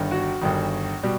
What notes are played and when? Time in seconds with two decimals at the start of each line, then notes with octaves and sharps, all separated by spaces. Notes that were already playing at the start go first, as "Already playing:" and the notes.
Already playing: G1 G2 D#3
0.11 F#4
0.41 G1 G2 D#3
1.03 B2 G3